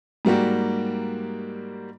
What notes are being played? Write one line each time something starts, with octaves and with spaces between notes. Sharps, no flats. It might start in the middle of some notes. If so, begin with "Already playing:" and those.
G#2 G3 A#3 F#4 G4